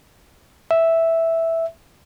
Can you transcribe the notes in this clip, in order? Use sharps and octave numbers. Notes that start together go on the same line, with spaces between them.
E5